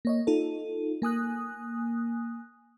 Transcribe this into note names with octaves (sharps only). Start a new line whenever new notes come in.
A#3 C#5 D#5
D#4 F4 A4
A#3 G#5 D#6 F#6